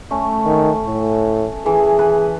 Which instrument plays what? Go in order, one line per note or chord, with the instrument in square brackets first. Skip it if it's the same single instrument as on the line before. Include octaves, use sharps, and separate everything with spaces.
[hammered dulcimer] A3 C#4
[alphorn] D#3
A2
[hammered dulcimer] E3 [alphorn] G#4
[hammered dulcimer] B4